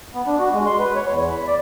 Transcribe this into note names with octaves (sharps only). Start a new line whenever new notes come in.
B3
D4
F#4
G#3
C6
B4
C#5
E2
B5
D5